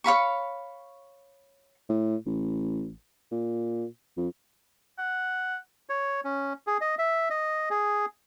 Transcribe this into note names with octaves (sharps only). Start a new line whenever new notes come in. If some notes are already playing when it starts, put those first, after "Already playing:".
C#5 F5 B5 C#6
A2
A1
A#2
F2
F#5
C#5
C#4
G#4
D#5
E5
D#5
G#4